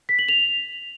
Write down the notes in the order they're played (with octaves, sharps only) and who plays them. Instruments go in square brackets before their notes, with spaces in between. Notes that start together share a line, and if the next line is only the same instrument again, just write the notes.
[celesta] B6
F#7
F7